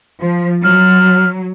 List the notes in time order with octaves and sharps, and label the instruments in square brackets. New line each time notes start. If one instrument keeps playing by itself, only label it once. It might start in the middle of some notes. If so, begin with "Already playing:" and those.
[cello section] F3
[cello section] F#3 [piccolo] F6